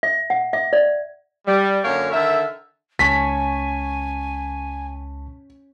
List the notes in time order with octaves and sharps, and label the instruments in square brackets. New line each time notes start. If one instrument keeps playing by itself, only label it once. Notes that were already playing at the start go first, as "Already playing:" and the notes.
[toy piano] E5
F#5
E5
D5
[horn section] G3
F#2 D3 A#3 A#4 C#5
D3 D#3 A#4 E5
[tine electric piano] C#2 A5 C#6 [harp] C#4 [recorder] G#5 [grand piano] B6